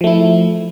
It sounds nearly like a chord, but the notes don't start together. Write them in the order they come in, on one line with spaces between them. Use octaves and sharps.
F3 A3 E4